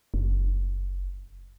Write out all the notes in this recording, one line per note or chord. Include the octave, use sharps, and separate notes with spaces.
F#1